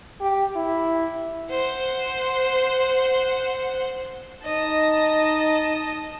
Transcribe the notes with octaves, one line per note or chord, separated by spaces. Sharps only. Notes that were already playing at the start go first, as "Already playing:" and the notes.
G4
E4
C5 F#5
D#4 D#5 A5